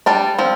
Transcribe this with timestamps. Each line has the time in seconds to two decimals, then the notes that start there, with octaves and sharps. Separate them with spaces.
0.06 G3 D4 A5
0.39 F3 C4